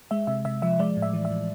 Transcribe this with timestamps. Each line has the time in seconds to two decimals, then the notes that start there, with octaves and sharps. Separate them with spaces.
0.11 G#3 E5
0.27 C3 E5
0.45 C3 E5
0.62 F3 E5
0.79 G#3 D5
0.97 A2
1.02 E5
1.13 E3
1.25 E5
1.31 A2